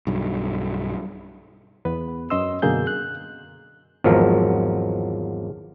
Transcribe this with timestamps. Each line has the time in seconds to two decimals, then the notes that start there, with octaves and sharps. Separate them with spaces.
0.07 B1 G2
1.85 E2 B3 B4
2.30 F#2 C#4 D#5 C6 E6
2.62 F#2 B2 D3 A#3 G#4 G6
2.87 F#6
4.04 G#1 E2 F3 F#3 A#4